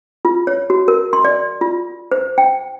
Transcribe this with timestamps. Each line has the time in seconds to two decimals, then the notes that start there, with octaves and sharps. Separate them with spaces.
0.25 F4
0.47 C#5
0.70 F#4
0.88 A#4
1.13 C6
1.25 D5
1.61 F4
2.11 C5
2.38 G5